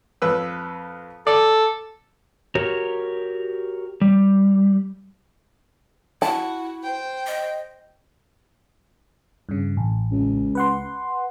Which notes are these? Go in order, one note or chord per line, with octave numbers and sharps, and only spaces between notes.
F2 B4 E6
A4 D5
F#4 G4 A#4 C#5
G3
E4 F#4 A5
C5 G5
D#5
G2 C#3
A1
C#2
B4 F#5 C6